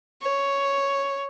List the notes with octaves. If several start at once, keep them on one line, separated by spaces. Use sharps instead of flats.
C#5